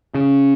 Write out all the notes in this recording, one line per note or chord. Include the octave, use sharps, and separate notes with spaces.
C#3